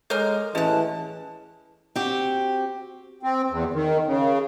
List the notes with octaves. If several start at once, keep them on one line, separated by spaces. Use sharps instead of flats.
G#3 A4 A#4 C#5 A#5 F6 G6
A1 E3 C#4 G#4 D#5 A5 F#6
C4 F#4 G4
C4
E2
D#3
C#3